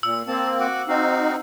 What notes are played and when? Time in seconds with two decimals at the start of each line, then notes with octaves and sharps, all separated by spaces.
0.03 A#2 E6
0.27 A#3 C4 A5
0.60 F#4 F#5 D6
0.88 C4 D#4 F#4 F5